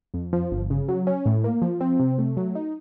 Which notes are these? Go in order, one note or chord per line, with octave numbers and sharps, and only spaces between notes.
F2
F3
G1
C#3
F#3
C#4
A2
A#3
F3
C4
C3
A3
F#3
D#4